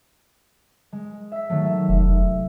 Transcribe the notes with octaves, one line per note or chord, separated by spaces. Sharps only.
G#3
E5 B6
D#3 F#3 A3
E5
F1 E5